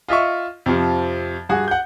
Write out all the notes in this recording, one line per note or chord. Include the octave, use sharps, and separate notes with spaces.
F4 D#5 E5 C#6
F2 C3 F3
G2 F#4 G#4
F#5 G6